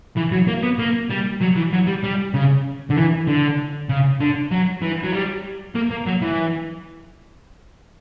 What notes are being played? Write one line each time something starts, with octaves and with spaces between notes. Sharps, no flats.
E3
F#3
A#3
B3
A#3
G3
F#3
E3
F#3
G3
G3
C#3
D3
E3
D3
C#3
D3
F#3
E3
F#3
G3
A#3
A#3
F#3
E3